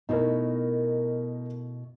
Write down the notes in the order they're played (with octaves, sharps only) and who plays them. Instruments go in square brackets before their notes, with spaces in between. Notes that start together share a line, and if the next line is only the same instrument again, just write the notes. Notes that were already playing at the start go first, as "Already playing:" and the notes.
[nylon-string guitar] B2 A3 E4 [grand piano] D#4 A#4